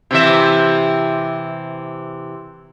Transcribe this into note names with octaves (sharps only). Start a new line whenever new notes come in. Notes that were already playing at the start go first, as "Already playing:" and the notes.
C3 E3 E5